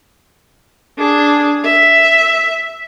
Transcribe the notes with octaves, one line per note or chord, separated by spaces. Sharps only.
D4 G#4
E5